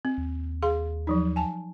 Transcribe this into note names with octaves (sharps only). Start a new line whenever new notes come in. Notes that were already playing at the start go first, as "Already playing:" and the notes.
C4
D#2
G#4 F5 C6
F3 F#3 D#4
G#5 A5